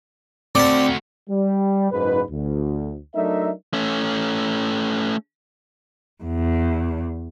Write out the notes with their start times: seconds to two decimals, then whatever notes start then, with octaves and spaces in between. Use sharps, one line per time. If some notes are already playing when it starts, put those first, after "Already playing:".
0.55 A3 C4 F#4 D5 A5
1.29 G3
1.92 F#1 G#2 B4
2.30 D2
3.15 F#3 A3 D4 D#4 A#4 E5
3.73 A3 C#4
6.23 E2